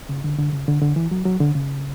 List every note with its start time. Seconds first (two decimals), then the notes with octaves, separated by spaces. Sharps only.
0.09 C#3
0.24 D3
0.38 D3
0.53 C#3
0.68 D3
0.82 D3
0.96 E3
1.11 F#3
1.26 F#3
1.40 D3
1.55 C#3